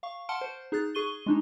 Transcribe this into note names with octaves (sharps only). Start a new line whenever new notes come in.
F5 C#6
F#5 A5 C6 F6 C#7 D7
C5
D#4 G#4 F#6 A6
G#4 C#6 D#7 G7
G#3 D4 D#4